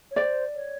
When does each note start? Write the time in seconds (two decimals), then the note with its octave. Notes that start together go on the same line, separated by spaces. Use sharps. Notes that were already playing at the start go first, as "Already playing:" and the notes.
0.11 C#5
0.16 C5 D5
0.55 C#5